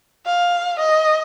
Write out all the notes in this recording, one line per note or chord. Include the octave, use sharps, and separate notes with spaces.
F5
D#5